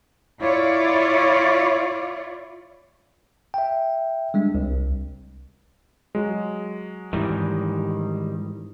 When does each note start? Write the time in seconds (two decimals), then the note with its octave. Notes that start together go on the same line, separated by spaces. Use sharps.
0.40 E4 F4 C#5 D5
3.54 E5 G5
4.34 G3 G#3 D4
4.55 C2
6.15 F#3 G#3
7.13 G#2 D#3 E3 G3